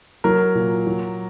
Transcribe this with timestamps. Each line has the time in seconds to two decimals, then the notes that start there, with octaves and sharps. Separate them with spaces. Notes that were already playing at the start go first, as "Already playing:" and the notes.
0.24 F#3 A#4
0.55 A#2
0.87 F#3